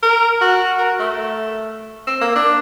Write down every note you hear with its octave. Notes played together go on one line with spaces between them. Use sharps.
A#4
F#4
A#4
A3
C4
A#3
D4